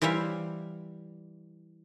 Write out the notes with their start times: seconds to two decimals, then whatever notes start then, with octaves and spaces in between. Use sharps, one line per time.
0.02 E3 G3 C5 E5 F5